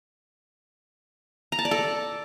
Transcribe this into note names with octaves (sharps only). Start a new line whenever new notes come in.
A#5
A5
D5
A4